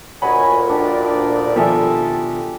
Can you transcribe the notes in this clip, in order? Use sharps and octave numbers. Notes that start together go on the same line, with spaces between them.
D2 A#2 F#4 C#5 D#5 F#5 G#5 B5
A#1 D4 D#4 G4 D5
B2 D#3 F3 G4 A4 E5 G#5